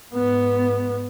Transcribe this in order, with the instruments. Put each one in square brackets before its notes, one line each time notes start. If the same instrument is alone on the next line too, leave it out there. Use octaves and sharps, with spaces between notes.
[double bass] G#2 B3